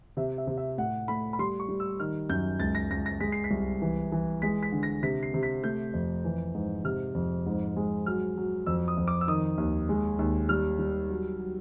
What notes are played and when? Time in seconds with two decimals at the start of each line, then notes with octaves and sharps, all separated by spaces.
0.17 C3 E5
0.38 E5
0.47 C3
0.57 E5
0.78 A2 F#5
1.08 A3 B5
1.33 B5
1.39 G3 C6
1.60 C#6
1.69 G3
1.80 E6
2.00 D#3 F6
2.29 F#2 G6
2.60 C#2 A6
2.75 A#6
2.91 C#2 A#6
3.06 A#6
3.20 G#3 B6
3.32 C7
3.44 B6
3.51 C2
3.82 E3
4.12 E3
4.42 G#3 B6
4.63 B6
4.72 D3
4.83 A#6
5.03 C3 B6
5.23 C7
5.34 C3
5.43 B6
5.63 A3 G6
5.94 F2
6.25 E3
6.55 G#2
6.84 C3 F6
7.15 F2
7.46 G#2
7.76 G#3
8.06 F#3 F6
8.37 F#3
8.66 F2 E6
8.88 D#6
8.97 F2
9.08 D6
9.21 E6
9.28 D#3 D#6
9.58 D#2
9.89 G#3
10.19 D#2
10.49 G3 F6
10.79 G3
11.10 F#3
11.40 F#3